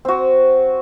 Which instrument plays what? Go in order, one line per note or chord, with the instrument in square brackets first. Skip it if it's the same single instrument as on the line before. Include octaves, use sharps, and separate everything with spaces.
[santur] C4 F#4